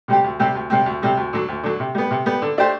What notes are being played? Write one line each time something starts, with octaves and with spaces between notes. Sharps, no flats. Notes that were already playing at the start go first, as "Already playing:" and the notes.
C3 G3 C4 G4
D2
C3 G3 C4 G4
D2
C3 G3 C4
D2
C3 G3 C4
D2
D3 F#3
D2
D3 F#3
C3
G3 B3
C3
G3 B3
D3
A3 D4 G4 C5